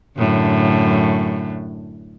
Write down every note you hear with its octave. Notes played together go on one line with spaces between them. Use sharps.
F#2 A2 D3